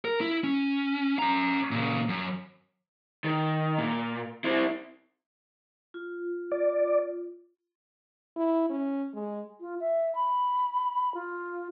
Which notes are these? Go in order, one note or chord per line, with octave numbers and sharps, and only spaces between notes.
A#4
E4
C#4
C#4 A#5
A#2 C#3
F#2
D#3
A#2
C4 E4
F4
D5
E4
C#4
G#3
F4
E5
B5
F4